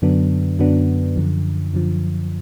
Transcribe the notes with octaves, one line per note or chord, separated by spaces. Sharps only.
F#2 D3 F#3 B3 D4
F#2 D3 F#3 B3 D4
F#2 D3 F3
F#2 D3 F3